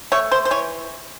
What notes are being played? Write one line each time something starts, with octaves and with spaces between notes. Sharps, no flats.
A3 C#5
C5
C5
E3 C#5